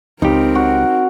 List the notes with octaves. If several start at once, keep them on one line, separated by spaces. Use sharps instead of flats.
C#2 C4 D#4 G4 A#4
F#4